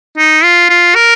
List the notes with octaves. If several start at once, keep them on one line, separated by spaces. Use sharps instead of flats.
D#4
F4
F4
A#4